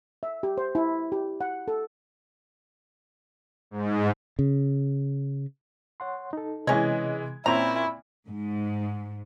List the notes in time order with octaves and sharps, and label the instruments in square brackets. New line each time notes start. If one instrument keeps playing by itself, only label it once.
[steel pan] E5
G4
C5
E4
G4
F#5
A4
[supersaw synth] G#2
[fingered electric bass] C#3
[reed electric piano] C#5 F#5 C6
D#4 A4
[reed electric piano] C3 [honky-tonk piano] E3 G#3 G#6 [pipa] C#4 D#5
[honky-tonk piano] A#2 C4 C#4 [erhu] E4 [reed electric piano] D5 B5 [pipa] A#5
[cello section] G#2